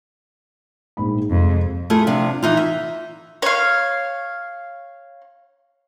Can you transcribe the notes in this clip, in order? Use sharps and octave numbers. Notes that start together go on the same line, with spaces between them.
A#1 G#2 B5
F2 C3 G#3
A3 E4 F4 G#4
C3 F3 D4
E3 D#4 F4
E5
C#5 F5